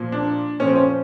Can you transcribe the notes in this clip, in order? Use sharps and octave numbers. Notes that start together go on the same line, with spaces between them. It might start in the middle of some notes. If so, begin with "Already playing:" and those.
Already playing: A#2 F3
D4
A#2 F3 C#4
C4
C#4